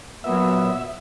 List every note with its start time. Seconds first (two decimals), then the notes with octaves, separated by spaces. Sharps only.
0.24 A#2 F#3 B3 E5